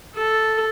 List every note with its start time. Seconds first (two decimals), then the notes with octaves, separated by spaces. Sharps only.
0.16 A4